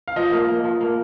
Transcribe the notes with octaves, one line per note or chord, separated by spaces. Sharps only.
F5
F3 D#5
A#3
A#3
F3
A#3